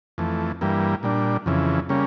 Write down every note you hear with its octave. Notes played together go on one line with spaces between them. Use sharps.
F2 E3 A3
G2 E3 G3 A#3
A#2 G3 D4
F2 C#3 E3
C#3 G3 A#3 C#4